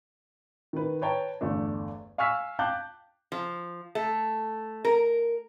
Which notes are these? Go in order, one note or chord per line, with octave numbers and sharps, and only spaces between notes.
D#3 B4
B4 C#5 G5 A5 A#5
G1 E2 A3 D4
F5 G#5 C#6 E6 F6 B6
F5 G5 A5 D6 F#6 G6
F3
A3
A#4